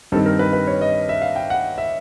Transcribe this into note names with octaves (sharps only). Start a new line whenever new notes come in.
G2 D#3 G3 C4 A4
A#4
B4
B4
C#5
D#5
E5
F5
G5
F#5
E5